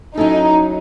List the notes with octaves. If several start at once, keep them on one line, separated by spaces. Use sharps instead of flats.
F#3 C#4 D#4 E4 A4